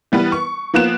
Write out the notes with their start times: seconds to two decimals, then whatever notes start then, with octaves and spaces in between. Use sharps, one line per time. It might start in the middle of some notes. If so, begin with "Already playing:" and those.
0.12 E3 G3 B3 B4
0.32 C#6
0.74 F3 A#3 B3 F#6 E7